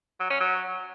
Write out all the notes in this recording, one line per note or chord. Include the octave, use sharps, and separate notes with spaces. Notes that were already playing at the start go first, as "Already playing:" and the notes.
F#3
C#4
F#3